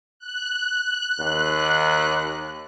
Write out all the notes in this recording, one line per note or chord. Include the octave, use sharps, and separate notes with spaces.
F#6
D#2